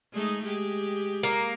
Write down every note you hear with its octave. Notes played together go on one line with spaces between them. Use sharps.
G#3 A3 D#4
G#3 G4
A#3